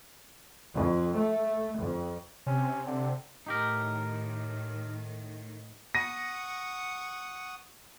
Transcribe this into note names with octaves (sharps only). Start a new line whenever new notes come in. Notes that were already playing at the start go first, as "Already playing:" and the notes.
F2
A3
F2
C3 C#4
D3
A2 D#3 D#4 G4 A#4
F#5 C#6 D#6 A#6 D#7